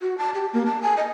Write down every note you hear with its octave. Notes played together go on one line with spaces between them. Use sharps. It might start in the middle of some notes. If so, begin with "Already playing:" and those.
F#4
A5
G4
A#3
A5
G#5
D#5